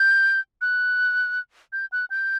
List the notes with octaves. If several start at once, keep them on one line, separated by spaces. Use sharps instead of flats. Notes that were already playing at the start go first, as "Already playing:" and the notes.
Already playing: G6
F#6
G6
F#6
G6